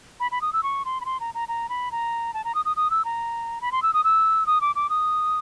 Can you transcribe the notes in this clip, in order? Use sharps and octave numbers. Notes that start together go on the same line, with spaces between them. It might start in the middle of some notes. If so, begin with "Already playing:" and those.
B5
B5
D#6
E6
C#6
C6
B5
C6
A#5
A#5
A#5
B5
A#5
A5
A#5
D#6
D#6
D#6
E6
A#5
B5
C6
E6
D#6
E6
D#6
D6
D6
D#6